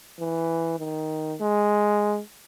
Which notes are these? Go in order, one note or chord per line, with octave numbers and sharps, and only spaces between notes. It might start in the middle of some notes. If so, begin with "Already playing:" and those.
E3
D#3
G#3